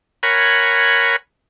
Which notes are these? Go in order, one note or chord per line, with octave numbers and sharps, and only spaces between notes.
A#4 C#5 F#5 G#5 B5